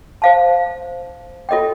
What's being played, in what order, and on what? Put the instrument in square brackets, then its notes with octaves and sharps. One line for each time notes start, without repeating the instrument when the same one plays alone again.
[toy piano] C5 F5 A5
F4 A4 D#5 G5